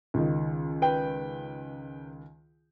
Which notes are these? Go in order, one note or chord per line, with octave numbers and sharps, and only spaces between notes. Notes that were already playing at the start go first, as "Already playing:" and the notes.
C#2 D#3
B4 G5